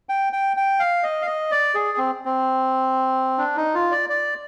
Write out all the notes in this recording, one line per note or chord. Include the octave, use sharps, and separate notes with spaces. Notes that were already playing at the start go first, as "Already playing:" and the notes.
G5
G5
G5
F5
D#5
F5
D#5
D5
G#4
C4
C4
D4
D#4
F4
D5
D5